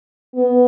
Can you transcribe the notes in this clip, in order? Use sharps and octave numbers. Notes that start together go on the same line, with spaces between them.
B3